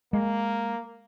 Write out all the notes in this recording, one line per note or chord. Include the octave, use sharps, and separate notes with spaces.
G#3 A#3